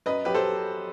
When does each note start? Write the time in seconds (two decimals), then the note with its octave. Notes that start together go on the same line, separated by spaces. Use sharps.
0.06 F#2 B4 D#5
0.25 F#3 G4 B4
0.34 A4 C5